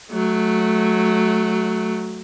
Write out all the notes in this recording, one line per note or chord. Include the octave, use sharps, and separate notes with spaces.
F#3 A3